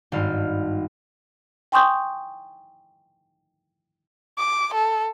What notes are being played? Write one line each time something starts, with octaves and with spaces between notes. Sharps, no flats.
G#1 G2 A4 F5
G5 G#5 C6 C#6 D#6 G6
D6
A4